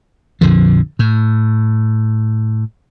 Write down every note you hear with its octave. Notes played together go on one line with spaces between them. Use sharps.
A#1 F2 D3 F3
A2